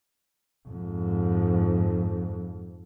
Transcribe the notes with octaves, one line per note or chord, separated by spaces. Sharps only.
F2 G#2